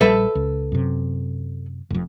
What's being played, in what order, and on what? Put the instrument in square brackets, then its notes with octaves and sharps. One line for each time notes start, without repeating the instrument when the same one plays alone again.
[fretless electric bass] A#1 G3 [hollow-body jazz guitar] A4 B4 E5
[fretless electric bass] C#2
F#2 C3
F1 F2